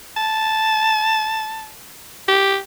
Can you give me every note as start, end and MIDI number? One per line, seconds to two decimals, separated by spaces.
0.17 1.70 81
2.28 2.57 67